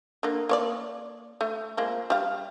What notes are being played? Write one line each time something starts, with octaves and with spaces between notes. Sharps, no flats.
D3 A#3
A#3 C#5 D5
A3
F3 G#3 A#3
G3 F5